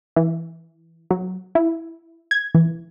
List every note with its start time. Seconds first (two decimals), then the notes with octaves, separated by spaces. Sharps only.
0.16 E3
1.10 F#3
1.55 E4
2.31 G#6
2.55 E3